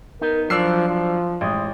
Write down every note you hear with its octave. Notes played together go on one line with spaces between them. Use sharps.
B3 D#4 A#4
F3 F#3 D4 D5 E6 C7
F3
A1 G#3